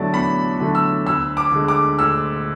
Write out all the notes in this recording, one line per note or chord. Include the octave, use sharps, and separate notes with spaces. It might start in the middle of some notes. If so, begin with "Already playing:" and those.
Already playing: E2 D3 F#3 A3 D5
E2 B5
D3 F#3 A3
E6
D2 E6
D6
D3 G#3
D6
D2 E6